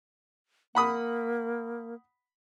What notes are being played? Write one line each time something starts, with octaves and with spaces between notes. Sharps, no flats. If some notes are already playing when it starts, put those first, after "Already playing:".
A#3 F#5 B5 D#6